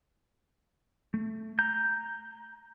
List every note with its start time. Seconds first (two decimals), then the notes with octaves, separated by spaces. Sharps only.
1.14 A3
1.59 A#5 G6